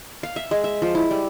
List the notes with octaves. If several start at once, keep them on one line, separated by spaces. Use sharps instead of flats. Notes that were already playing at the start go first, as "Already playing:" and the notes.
F5
E5
G#3
E5
F3
E4
G3